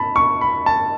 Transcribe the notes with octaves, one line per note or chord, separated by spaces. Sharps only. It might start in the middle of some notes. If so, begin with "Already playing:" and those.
Already playing: A5 B5
C#6
B5
A5